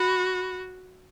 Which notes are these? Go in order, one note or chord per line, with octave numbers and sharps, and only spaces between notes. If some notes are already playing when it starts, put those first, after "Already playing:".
Already playing: F#4 B5